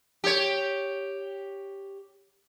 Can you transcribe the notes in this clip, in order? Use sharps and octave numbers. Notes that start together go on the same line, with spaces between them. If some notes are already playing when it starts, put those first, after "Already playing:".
G4 C#5